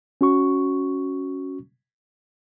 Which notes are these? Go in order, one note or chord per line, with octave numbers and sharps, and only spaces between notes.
C#4 F#4 C#6